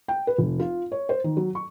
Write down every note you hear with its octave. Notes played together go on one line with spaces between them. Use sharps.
G5
B4
F1
F4
C#5
C5
D#3
F#3
C#6